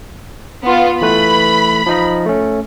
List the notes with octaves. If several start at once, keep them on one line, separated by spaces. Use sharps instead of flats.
B3 F4
E3 A3 B4 B5
F3 D#4 D#5
A3 C#4